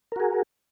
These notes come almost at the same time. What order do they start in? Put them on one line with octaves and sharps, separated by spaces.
A#4 F#4 G#4